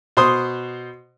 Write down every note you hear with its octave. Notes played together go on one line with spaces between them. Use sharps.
B2 C5 C6 D#6